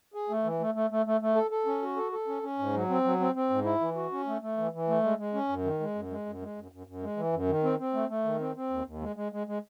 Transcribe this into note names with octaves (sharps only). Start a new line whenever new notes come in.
G#4
A3
E3
A3
A3
A3
A3
A3
A4
A4
C#4
F#4
A4
A4
C#4
C#4
G#2
F#3
C4
F#3
C4
C4
G#2
E4
E3
F#4
C#4
A3
A3
E3
E3
A3
G#3
G#3
C#4
F#2
D#3
G#3
F#2
G#3
F#2
G#3
F#2
F#2
F#2
G#3
E3
F#2
D#3
C4
C4
A3
A3
D#3
C4
C4
D#2
D#2
G#3
G#3
G#3
G#3